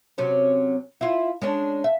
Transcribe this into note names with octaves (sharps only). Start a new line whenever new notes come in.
C3 F#3 C#4
E4 F4
G#3 C#4 D4
E5